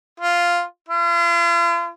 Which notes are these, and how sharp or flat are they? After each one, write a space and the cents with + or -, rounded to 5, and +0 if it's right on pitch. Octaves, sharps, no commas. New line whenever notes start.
F4 -5
F4 -40